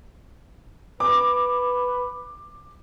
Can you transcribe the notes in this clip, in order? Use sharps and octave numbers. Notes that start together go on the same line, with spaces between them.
B4 D6